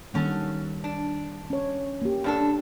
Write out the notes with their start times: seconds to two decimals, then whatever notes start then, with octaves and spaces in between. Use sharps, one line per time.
0.14 D#3 F#3 G3 A#3 C#4 A4
0.84 D4
1.50 C#4 C#5
2.02 A#3 G4
2.24 G2 D4 A4